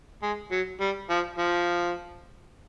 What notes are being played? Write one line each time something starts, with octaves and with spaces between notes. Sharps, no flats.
G#3
F#3
G3
F3
F3